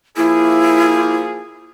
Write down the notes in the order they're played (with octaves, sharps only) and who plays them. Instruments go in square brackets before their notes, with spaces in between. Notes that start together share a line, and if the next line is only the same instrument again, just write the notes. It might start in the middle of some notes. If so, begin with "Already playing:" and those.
[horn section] F3 A#3 G#4 [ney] E4